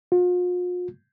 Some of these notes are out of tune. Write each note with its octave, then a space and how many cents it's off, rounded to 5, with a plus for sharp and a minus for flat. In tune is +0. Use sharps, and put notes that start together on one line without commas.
F4 +45